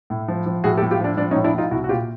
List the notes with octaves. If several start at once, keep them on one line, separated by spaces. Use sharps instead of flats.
A2
F3
F3
A2 F#4 G#4
G4 A4
A2
F4 G4
F3 D4
F3 D4
C#4 D#4
A2
D4 E4
A2 D#4 F4
C2 E4 F#4
F#4
A#2 F4 G4